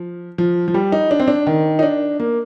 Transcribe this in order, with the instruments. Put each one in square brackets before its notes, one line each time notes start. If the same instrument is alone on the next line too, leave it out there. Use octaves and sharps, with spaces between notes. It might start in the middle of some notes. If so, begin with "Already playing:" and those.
Already playing: [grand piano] F3
F3
F3
G3
D#4
D4
C4
D4
D#3
D#4
D4
A#3